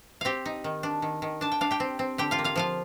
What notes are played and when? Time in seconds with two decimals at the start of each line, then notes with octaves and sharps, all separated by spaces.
0.21 C4 G4 F5 G5
0.45 D#4
0.64 D#3
0.83 D4
1.02 D#3
1.22 D#3
1.41 D4 A5
1.52 G5
1.61 D4 F5
1.71 G4 G5
1.80 C4
1.99 C4
2.18 D3 G4 G5
2.31 F4 F5
2.39 A#3
2.44 F4 F5
2.56 F3 F4 F5